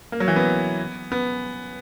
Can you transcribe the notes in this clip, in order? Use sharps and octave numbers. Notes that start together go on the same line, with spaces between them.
A#3
F#3
E3
B3
B3